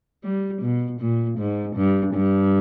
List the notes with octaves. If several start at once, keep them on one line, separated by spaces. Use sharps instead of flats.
G3
B2
A#2
G#2
G2
G2